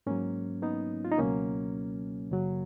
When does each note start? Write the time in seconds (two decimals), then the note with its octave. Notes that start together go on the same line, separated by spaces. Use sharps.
0.06 G#2 F#3 A#3 C#4
0.62 B3 D#4
1.05 F4
1.12 D#4
1.18 C#2 B2 F#3 A#3 C#4
2.31 F#2 C#3 F#3